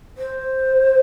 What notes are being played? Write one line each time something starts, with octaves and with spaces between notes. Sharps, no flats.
C5